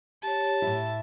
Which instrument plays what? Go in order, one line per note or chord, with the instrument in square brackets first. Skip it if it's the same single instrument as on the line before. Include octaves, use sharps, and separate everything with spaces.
[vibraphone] G4 C#5 [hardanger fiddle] A5
[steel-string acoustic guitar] A2 E4